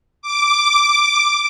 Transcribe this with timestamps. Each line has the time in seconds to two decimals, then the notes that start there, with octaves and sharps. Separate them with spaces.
0.22 D6